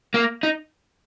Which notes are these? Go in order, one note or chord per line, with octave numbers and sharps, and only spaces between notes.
A#3
D#4